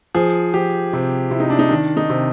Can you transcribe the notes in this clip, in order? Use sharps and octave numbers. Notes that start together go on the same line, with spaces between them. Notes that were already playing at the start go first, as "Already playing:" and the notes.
F3 G#4
F3 G4
C3
C3 E4
D#4
D4
D#4
D#3 D4
D#4
C3